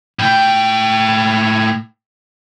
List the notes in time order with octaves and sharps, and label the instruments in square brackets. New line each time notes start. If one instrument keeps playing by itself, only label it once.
[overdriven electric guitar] A2 G5